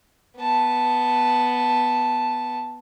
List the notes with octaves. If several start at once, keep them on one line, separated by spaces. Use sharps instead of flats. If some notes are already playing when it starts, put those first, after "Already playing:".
B3 A5